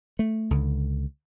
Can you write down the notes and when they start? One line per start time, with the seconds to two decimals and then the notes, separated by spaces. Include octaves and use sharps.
0.19 A3
0.51 C#2 D3